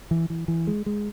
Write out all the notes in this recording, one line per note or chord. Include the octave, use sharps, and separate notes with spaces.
E3
E3
E3
G#3
G#3